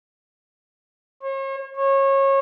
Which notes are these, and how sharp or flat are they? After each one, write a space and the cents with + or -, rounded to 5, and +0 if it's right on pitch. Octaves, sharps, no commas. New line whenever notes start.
C#5 -40
C#5 -25